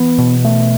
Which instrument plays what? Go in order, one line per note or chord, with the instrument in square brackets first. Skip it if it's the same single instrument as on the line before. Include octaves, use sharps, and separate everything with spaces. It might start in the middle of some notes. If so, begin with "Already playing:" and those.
Already playing: [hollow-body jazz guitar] E3 [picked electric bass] B3
[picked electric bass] B2
A3